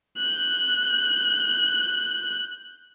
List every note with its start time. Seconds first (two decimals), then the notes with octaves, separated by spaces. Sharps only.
0.18 F#6 G6